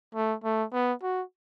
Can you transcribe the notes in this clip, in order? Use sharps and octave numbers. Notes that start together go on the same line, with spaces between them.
A3
A3
B3
F#4